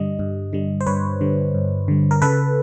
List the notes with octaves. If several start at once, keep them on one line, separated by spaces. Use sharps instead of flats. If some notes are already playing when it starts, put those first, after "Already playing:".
Already playing: G2 D3 G3 D#5
G2
D3 G3
C5
G2 B4 C#5
D3 G3
G2
D3 G3
A#4
C#3 A4 B4